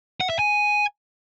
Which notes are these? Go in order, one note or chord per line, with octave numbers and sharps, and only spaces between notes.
F#5
E5
G#5